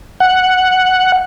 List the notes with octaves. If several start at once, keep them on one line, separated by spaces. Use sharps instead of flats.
F#5